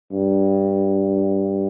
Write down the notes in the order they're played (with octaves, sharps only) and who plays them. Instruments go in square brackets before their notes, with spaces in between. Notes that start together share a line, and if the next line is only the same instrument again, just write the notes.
[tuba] G2